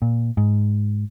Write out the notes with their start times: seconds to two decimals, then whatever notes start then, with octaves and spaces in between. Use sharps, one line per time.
0.02 A#2
0.37 G#2